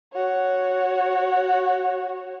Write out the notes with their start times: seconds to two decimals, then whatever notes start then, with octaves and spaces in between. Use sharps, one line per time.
0.13 F#4 C#5